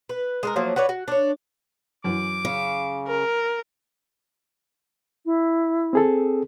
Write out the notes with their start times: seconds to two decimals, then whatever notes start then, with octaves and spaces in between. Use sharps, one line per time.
0.09 B4
0.43 G#3 A4 A#4
0.56 F3 F#3 A3 A#3
0.76 F#4 B4 C#5 D5
0.89 F#4
1.08 D4 C#5
2.04 F#2 E3 D6
2.45 C#3
3.07 A#4
5.26 E4
5.93 C4 G#4 A4